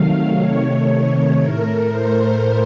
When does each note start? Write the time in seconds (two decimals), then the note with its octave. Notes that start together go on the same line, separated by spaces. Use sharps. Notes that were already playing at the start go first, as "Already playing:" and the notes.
Already playing: C3 D#3 F#3 A3 F5
0.38 C3 D#3 A3 C#5
1.40 A2 A3 A#4
1.91 C5